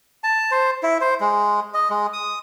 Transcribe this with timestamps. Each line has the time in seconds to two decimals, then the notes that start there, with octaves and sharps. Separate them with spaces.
0.24 A5
0.51 C5
0.83 E4
1.01 C5
1.21 G#3
1.74 D#5
1.90 G#3
2.13 D#6